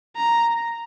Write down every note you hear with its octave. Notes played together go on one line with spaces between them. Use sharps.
A#5